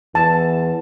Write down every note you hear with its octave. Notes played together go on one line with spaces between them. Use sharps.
E2 A5